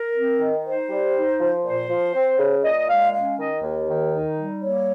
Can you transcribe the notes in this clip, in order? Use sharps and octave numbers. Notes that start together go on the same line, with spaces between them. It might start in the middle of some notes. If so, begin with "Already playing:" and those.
Already playing: A#4
C4
D#3
D#4 C5
G3
D#4
F3
A#2 C5
F3
C4
C#3
A#2 D#5
G#3 F5
C#4 F5
D#3 D#5
D#2
D#3
D#4
G3
A#3 C#5